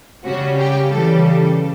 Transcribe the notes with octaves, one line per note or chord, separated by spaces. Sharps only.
C#3 G3 C#4 F#4
G4
C#3 E3 G3 A4
A4